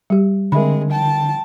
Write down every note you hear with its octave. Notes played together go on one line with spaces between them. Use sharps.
G3 G4
D3 G#3 C4 A#4 E5 B5
G5 A5